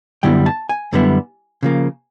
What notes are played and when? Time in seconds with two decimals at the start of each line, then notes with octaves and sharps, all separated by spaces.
0.23 F#2 D3 G3 B3 E4 G5
0.46 A5
0.69 G#5
0.93 F#2 D3 G3 B3 E4
1.63 C#3 F3 A#3